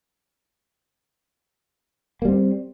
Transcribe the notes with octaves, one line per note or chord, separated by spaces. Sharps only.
G3 A#3 C4